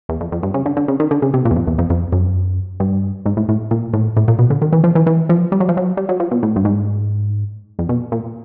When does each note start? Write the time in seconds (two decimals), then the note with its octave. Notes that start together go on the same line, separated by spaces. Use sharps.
0.09 E2
0.21 F2
0.32 F2
0.43 G2
0.54 C#3
0.66 D3
0.77 D3
0.88 C#3
1.00 D#3
1.11 D3
1.22 C#3
1.34 C3
1.45 A#2
1.51 E2
1.56 F2
1.67 E2
1.78 F2
1.90 F2
2.12 F#2
2.80 G2
3.26 G#2
3.37 A2
3.49 A2
3.71 A#2
3.93 A2
4.17 A2
4.28 A#2
4.39 B2
4.50 D3
4.62 D#3
4.73 E3
4.84 F3
4.95 E3
5.07 E3
5.29 F3
5.52 G3
5.60 F#3
5.69 F3
5.77 F#3
5.97 G3
6.09 F#3
6.20 F3
6.31 B2
6.43 A2
6.56 G2
6.65 G#2
7.79 F2
7.89 B2
8.12 A#2